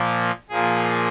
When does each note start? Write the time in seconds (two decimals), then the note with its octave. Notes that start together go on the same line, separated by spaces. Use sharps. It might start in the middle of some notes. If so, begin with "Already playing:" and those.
Already playing: A#2 F3 A#3
0.50 A#2 F3 A#3 G#4